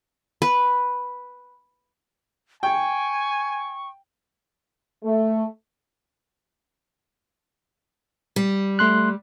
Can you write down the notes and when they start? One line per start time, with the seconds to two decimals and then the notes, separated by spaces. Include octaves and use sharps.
0.42 B4
2.63 G5 G#5 C#6
5.03 A3
8.36 G3
8.79 A3 C6 F#6